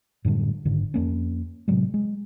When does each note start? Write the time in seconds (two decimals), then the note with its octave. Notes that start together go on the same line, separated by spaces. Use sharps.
0.25 F#2 A2 D3 G3
0.65 F#1 G#2 D3 D#3
0.94 F2 A#3 C#4
1.68 A2 C3 F#3 G#3
1.94 G#3